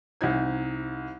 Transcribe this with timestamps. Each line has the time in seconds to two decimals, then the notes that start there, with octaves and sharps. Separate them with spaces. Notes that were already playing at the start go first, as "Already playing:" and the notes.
0.21 C2 C4 D#4 G#6